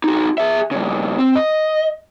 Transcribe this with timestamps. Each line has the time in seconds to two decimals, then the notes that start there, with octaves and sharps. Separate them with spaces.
0.04 D#4 F#4
0.38 G#4 E5
0.71 G2 C#3
1.19 C4
1.35 D#5